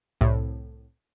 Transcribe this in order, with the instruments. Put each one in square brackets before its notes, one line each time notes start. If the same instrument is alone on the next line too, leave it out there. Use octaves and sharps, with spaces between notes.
[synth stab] C2 A2